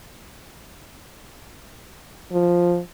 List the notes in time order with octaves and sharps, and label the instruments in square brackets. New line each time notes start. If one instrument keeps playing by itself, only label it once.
[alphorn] F3